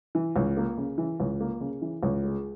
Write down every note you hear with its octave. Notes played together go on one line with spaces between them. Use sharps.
E3
C#2
A#3
C#3
E3
C#2
A#3
C#3
E3
C#2
G#3